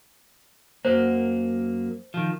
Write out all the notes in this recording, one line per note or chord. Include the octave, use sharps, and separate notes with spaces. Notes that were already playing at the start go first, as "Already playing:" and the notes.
F#2 F#3 A#3 C5
D#3 F3